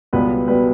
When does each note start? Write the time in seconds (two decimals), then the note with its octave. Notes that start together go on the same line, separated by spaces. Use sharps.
0.13 C#2 B2 G3 B3 B4
0.48 B2 G3 B3 B4